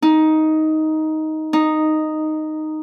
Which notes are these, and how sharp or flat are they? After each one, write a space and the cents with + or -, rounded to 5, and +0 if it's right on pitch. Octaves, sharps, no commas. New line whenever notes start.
D#4 +10
D#4 -5